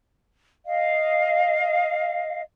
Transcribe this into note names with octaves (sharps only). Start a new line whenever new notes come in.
D#5 F5